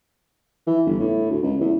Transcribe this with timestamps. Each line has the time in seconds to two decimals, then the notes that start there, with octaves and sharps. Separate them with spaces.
0.67 E3
0.86 G1
0.99 A2
1.30 D2
1.42 C#2
1.61 E2